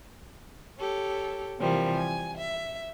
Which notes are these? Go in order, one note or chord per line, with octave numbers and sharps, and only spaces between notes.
G4 A4 C#5
C3 E3 F3 G3 A#3
G#5
E5